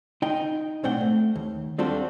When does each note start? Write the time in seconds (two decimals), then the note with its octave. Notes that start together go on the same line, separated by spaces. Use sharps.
0.22 D#4 D#5 G5
0.83 B1 A2 C4 D4 F#5 G5
1.01 A3
1.36 D#2
1.78 G3 C4 D4 F4 F#4 A4